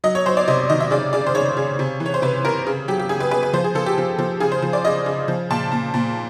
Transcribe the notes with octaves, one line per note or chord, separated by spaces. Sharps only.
F#3 D#5
C#5
F#3 C5
D5
C3 D#5
D#3 D#5
E5
C#3 D5
C#3 D5
C5
C#3 C#5
C#3
C3
E3
C#5
C5
C3 B4
C3 A#4
C#3
F#3 G4
G4
C#3 G#4
B4
C#3 B4
B4
F3 C5
G#4
F3 A4
G4
F3
F3
C#3 G#4
C5
F3
D5
C#3 D#5
C#3
F3
A#2 A5
A#2
A#2